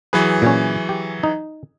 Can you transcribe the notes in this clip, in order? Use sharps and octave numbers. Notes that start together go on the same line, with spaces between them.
E3 F#3 G#4 B4
A#2 C#4
G4
D#4